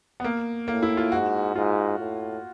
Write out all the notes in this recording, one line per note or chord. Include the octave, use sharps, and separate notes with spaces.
B3
A#3
A2 A#3
E4
F4
G#2 F#4
G#2 F4
A2